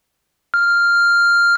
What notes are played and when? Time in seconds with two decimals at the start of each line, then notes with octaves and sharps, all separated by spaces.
0.54 F6